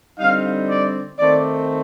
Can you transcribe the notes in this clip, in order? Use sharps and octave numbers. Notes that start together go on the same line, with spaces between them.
D3 G3 C4 D#4 F5
D5
D#3 A3 C4 D5